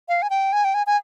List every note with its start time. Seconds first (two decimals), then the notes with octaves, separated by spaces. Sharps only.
0.09 F5
0.22 G#5
0.30 G5
0.53 G#5
0.64 G5
0.74 G#5
0.87 G#5